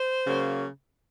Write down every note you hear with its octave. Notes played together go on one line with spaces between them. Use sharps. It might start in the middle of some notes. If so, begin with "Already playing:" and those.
Already playing: C5
C#3 F#3 A#3